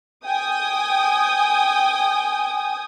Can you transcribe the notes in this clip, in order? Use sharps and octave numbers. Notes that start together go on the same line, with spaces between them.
G5 G#5 D#6